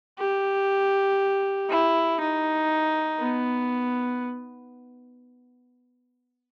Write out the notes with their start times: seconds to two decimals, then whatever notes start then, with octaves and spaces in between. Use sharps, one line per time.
0.19 G4
1.70 E4
2.20 D#4
3.20 B3